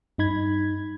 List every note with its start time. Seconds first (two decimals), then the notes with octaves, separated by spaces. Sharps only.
0.18 G2 D#4 B5 G#6